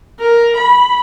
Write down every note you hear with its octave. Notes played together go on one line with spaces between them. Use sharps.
A#4
B5